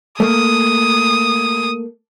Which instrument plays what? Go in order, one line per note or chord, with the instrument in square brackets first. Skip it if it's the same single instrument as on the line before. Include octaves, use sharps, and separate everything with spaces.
[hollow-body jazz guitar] A3 A#3 [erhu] D#6